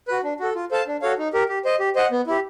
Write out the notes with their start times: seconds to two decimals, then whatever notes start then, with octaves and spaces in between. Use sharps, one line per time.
0.08 F#4 B4
0.23 D4
0.40 F#4 A4
0.55 F4
0.71 A4 C5 F5 A5
0.87 D4
1.02 F#4 A4 C#5 F5
1.18 D#4
1.33 G4 A#4
1.49 G4
1.65 C5 D#5
1.80 G4
1.96 C5 D#5 F#5
2.11 B3
2.27 E4 G4